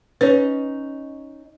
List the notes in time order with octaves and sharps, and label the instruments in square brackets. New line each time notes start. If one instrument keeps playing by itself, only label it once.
[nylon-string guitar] C#4 D#4 [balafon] B4 C#5